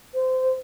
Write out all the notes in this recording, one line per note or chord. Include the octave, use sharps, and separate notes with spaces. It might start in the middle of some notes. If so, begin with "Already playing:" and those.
C5